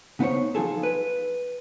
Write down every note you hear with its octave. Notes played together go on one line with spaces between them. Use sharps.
C#3 B3 D#4 C5 C#5
F3 D#4 F4 G#4 A4
B4